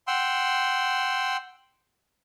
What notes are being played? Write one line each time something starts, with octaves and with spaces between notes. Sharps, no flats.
F#5 G5 C6 E6